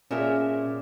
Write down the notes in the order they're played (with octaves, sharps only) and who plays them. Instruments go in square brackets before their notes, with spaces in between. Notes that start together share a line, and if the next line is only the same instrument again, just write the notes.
[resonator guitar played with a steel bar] A#2 A#4 E5 [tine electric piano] C#4 G#4